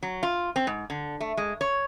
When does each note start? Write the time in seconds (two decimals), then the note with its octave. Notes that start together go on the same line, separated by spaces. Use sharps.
0.03 F#3
0.23 F4
0.56 C4
0.67 G#2
0.90 D3
1.20 A3
1.37 G#3
1.61 C#5